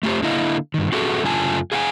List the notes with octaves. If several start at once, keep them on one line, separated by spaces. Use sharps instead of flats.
A3 F4 G4 C5
D3 A#3 E4 D#5 F5
G2 D#3
C4 F#4 G#4 A4 E5 F#5
F#2 C#3 A3 F4 G#5 A5
G#4 F5 F#5 G#5